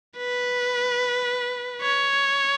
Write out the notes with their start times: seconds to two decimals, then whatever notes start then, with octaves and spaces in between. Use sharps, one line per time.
0.18 B4
1.82 C#5